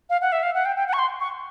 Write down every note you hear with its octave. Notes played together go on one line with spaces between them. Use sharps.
F5
F#5
E5
F5
F#5
G5
G5
F#5
C#6
C6
C#6